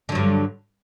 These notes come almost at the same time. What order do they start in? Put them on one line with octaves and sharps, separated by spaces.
D3 F#3 G2